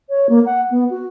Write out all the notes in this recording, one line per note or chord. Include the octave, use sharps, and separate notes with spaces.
C#5
A#3
F#5
B3
F#4